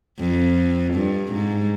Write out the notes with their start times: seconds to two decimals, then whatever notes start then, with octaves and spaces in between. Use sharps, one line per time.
0.19 F2
0.94 G2
1.33 G#2